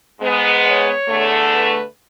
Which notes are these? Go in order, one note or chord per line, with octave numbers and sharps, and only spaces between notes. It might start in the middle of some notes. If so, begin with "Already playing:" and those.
G#2 G#3 B3
C#5
E2 D3 A3
B4